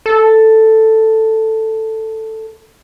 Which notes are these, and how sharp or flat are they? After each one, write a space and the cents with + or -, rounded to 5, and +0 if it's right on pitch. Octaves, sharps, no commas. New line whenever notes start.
A4 +5